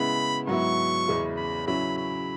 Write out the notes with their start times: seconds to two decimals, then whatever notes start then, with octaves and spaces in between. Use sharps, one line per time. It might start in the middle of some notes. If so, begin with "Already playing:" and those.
Already playing: C#3 G#3 B3 E4 B5
0.47 G#2 F#3 B3 E4 C#6
1.08 E2 C#3 G#3 C#4 E4
1.37 B5
1.67 C#3 F#3 C#4 E4 B5
1.98 B5